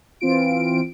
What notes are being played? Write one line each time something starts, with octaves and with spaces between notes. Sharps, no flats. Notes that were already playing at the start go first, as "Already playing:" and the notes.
E3 C4 F4 D7